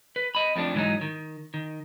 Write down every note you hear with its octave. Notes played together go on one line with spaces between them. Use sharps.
B4
D#5 B5
F2 F3 A3 D4
G#2 E3 F#3 D#4
D#3
D#3